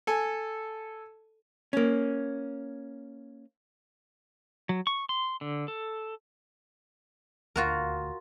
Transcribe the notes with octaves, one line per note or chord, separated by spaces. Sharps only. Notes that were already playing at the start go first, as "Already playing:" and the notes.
A4 G#5
A#3 C#4
F#3
C#6
C6
D3
A4
D#1 D2 F4 F#4 A#4